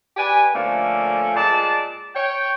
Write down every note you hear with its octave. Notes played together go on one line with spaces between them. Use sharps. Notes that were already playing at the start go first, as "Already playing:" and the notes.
G4 B4 D5 G#5
D3 F3 A3 A#3 C#4
A#2 G#3 D5 A5
C#5 G5